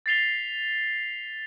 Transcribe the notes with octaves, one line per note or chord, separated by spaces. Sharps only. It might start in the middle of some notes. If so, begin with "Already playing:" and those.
A6 B6 C7 F7 G7